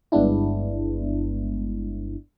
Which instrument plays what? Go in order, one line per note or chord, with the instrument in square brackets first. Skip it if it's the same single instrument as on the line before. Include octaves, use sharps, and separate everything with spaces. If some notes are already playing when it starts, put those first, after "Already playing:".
[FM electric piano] G1 G2 G#3 B3 D4 E4